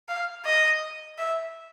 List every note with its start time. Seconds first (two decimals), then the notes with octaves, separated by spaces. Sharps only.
0.08 F5
0.45 D#5
1.18 E5